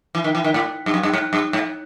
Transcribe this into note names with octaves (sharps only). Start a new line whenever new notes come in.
E3
D#3
E3
D#3
A2
G2
F#2
G2
G#2
G2
G#2